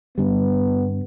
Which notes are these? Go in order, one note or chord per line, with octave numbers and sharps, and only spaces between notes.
G2 D3 G3 B3